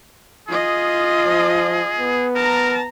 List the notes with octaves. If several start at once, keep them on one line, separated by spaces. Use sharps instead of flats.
F4 G#4 D#5
F3
B3
A#4 A5 A#5